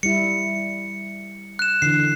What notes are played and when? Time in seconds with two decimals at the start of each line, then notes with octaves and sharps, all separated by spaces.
0.03 G3 E4 C#7
1.59 F#6 E7
1.82 D3 E3 C7